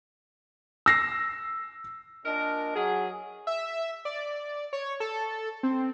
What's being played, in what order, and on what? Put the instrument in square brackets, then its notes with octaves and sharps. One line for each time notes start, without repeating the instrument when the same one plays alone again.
[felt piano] E6 A#6 C7
[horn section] A#2 D4 A#4 D#5
F#3 G#4
[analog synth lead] E5
D5
C#5
A4
C4